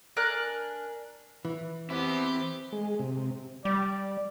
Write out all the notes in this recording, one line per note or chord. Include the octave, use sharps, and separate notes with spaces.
D4 A#4 G#5 F#6
E3
B3 C4 E4 G4
G#3
C3
G3 D5